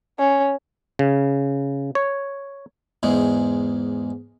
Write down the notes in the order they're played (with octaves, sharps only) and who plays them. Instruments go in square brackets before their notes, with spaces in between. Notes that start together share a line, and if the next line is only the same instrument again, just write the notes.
[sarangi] C#4
[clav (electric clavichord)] C#3
C#5
[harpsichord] E2 G#2 G#3